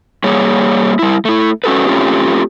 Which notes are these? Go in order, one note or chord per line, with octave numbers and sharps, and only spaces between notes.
G3 A#3 G#4 C#5
G3 E4
A3 E4
C#4 F#4 A4 B4
A3 C4 C#4 F4 G4